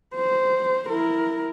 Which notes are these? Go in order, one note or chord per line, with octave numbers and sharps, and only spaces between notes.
C5
E4 A#4